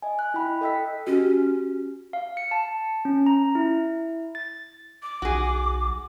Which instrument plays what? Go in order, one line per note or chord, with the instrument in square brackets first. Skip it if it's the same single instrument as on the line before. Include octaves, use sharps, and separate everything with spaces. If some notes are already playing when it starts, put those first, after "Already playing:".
[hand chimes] D#5 G#5
F#6
E4 G5 B5
A4 D#5 G5 E6 B6
[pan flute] C#4 [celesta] F#4 G4
[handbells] F5
C#7
A5
C#4
A#5
E4
A6
[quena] D6
[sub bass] B1 [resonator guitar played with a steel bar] F#4 G#4